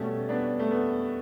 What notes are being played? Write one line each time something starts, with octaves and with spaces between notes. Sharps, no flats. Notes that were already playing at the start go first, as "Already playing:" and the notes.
Already playing: B2 G3 A3 C#4
B3 D4
A3
B3